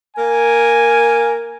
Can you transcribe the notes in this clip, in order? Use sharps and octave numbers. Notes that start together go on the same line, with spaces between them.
A#3 A#4 G#5